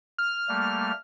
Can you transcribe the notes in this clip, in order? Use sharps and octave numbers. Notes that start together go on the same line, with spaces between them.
F6
G3 A3 A#3